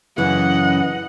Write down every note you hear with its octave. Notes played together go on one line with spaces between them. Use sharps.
F#2 C#3 E3 D#5 F#5